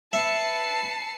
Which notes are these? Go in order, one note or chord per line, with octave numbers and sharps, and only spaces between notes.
B4 E5 A5 C7 C#7